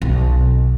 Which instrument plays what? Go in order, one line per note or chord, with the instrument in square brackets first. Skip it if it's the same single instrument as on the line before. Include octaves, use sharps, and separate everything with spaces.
[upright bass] B1